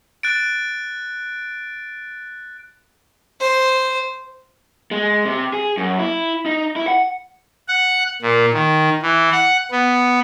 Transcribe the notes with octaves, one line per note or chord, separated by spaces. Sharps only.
F#6 A6 D7
C5
G#3
C3
G#4
F#2
E4
D#4
E4
F#5
F#5
A#2
D#3
E3
F#5
B3